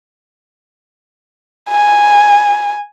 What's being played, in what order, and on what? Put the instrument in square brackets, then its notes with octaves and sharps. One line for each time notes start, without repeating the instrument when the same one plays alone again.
[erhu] G#5